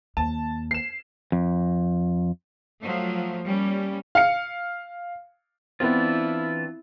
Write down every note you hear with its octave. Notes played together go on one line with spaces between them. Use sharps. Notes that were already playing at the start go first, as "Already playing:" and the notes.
D#2 A5
C7 E7
F2
F3 F#3 A3
G3 A#3 C#4
F5 C#7
E3 B3 C4 D4 E4 F4